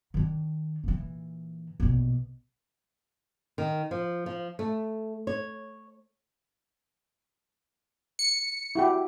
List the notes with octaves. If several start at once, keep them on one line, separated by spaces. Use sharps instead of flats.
D#3 D4
A#2 E3
A#1 B2
D#3
F3
F3
A3
C#5
C#7
E4 F#4 G4